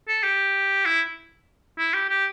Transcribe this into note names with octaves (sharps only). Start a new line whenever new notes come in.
A4
G4
E4
E4
G4
G4